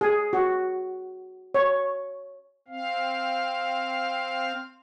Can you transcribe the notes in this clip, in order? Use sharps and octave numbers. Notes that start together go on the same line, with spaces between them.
G#4
F#4
C#5
C4 F5